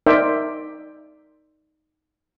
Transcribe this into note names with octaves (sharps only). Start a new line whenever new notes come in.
D#4 A#4 C5 D5 E5 G5